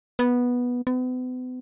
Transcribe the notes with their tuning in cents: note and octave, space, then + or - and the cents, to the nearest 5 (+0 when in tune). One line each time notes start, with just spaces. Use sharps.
B3 -10
B3 +40